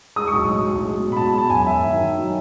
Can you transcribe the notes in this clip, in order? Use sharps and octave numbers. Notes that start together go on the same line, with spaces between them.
G#3 D#6
C#6
B1
A2
B1
G#3
B2
B5
B2 A5
G#3 A5
F#2 G#5
F#2 E5
D#3
D#3
F#3